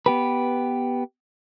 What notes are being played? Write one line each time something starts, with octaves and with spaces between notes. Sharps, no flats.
B3 G4 B4